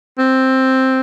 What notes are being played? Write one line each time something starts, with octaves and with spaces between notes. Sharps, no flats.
C4